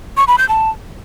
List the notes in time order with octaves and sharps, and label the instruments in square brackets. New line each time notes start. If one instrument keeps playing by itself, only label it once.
[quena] C#6
B5
G6
A5